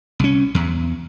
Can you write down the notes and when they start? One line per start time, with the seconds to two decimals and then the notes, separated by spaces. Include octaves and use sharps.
0.19 C2 C#4
0.54 E2